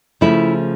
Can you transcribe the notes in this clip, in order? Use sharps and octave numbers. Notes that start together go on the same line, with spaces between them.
C#3 F3 A3 E4